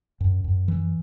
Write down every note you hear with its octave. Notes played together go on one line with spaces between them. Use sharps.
F#2
F#2
E3